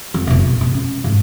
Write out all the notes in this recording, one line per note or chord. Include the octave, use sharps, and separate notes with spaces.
F2
F1 B2
A#1
B2
C#4
G#2